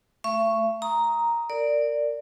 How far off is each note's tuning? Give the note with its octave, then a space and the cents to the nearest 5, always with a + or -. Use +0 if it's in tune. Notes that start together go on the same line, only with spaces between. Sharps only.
A3 +0 E5 +40 C#6 +0
A#5 +0 D#6 +15
A#4 -25 D5 +0